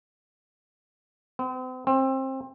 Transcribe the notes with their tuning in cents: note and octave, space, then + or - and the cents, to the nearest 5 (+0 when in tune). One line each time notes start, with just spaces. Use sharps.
C4 -40
C4 +25